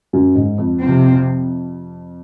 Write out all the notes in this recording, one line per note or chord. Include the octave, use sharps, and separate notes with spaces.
F#2
G#2
F2
C3 F3 C4